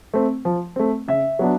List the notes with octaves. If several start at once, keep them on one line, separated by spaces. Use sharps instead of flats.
A3 C4
F3
A3 C4
C#3 E5
F#3 B3 D4